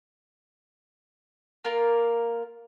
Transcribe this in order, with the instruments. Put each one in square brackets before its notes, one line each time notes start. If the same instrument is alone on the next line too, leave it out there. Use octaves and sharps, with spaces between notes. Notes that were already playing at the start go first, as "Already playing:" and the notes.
[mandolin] A#3 F4 A#4